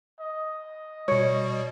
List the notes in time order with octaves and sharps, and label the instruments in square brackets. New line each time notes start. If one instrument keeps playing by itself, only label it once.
[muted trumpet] D#5
[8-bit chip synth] B2 G3 [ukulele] C#5